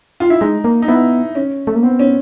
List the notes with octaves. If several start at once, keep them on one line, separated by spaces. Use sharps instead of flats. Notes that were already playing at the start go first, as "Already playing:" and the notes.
F4
E4
G#3 D#4
A#3
D#4
B3 E4
C#4
A3
A#3
B3 C4
C#4